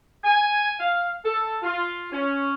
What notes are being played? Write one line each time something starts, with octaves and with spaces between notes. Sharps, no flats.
G#5
F5
A4
F4
C#4